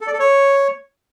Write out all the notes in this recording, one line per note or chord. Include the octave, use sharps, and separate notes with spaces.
A4
D5
A4
C#5